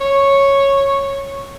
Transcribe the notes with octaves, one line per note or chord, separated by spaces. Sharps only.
C#5